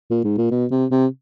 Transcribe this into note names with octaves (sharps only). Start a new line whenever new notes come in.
A#2
G#2
A#2
B2
C3
C3